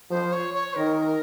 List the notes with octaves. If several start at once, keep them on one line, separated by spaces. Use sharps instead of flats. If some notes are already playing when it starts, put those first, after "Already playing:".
F3 C5
C#5
C#5
D#3 A#4